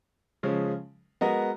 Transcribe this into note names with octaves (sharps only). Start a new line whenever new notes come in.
C#3 F3 G#3 C#4
G#3 B3 F#4 A#4 D#5